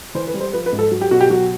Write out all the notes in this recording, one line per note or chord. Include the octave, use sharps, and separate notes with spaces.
E3 C5
B4
G3
C5
F3 B4
B4
G#2
A4
F#3
G4
B2 F#4
G4
F#3 F#4